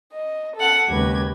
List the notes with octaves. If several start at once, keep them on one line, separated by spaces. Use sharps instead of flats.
D#5
A4 F#5
D#2 C#3 G#3 G4 B4 G#6